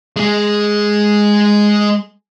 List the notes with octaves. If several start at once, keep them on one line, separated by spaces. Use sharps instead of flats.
G#3 G#4